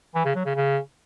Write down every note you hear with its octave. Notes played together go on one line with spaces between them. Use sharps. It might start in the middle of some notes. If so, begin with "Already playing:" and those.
E3
C#3
F#3
C#3
C#3